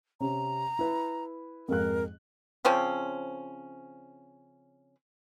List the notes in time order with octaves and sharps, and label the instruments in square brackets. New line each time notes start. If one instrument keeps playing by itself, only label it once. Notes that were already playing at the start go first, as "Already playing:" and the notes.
[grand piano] C3 C4 C#4 [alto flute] A#5
[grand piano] E4 B4
[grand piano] F2 G#2 F#6 [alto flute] A#4
[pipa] C#3 F3 C4 C#4